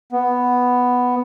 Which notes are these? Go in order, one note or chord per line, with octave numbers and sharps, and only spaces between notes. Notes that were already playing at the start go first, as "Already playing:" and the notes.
B3